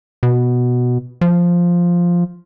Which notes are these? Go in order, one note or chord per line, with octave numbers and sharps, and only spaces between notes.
B2
F3